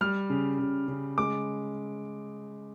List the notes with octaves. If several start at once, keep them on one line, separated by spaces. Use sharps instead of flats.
G3 F6
C#3
C#3
C#3
G#3 D6